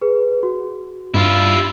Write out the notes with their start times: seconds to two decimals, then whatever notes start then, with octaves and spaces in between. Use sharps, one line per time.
0.01 G#4 B4
0.43 F#4
1.14 G2 E4 F4